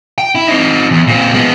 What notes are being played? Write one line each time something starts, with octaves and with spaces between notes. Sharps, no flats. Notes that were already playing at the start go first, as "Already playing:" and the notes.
G5
E4
C4 D#4
E2
A#2 C4
G#3 B3